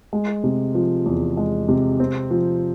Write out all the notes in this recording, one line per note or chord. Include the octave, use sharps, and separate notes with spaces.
G#3
C3
F3
E2
G#3
C3
C4
F3